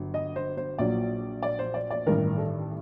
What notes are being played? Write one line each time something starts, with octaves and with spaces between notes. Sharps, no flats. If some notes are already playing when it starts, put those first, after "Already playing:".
Already playing: G1 F#3
D#5
C5
C5
A#1 A#2 F#3 D5
D5
C5
D5
D5
A1 G2 D#3 A#4
A4